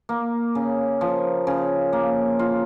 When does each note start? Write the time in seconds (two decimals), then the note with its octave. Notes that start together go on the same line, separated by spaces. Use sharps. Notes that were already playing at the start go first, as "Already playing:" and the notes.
0.09 A#3
0.55 C#3
1.01 F3
1.47 C#3
1.93 A#3
2.39 F4